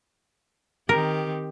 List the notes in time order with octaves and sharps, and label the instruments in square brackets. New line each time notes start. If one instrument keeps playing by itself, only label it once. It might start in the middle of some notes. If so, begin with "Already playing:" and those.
[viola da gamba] D#3 C4 G4 [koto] A#4